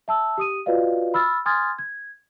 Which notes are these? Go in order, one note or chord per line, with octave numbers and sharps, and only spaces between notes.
E5 A5 E6
G4 D#6 D#7
F4 F#4 B4 D5 D#5 F5
B5 E6 F6 A6
G#5 C6 D#6 F6 G#6 A6
G#6